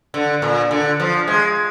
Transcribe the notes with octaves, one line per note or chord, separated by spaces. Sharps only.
D3
A#2
D3
F3
G#3